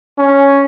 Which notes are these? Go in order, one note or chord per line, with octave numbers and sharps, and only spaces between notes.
C#4